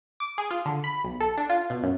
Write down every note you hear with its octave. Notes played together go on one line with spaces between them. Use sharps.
D6
G#4
F4
D3
B5
B1
A4
D4
F4
B2
F#2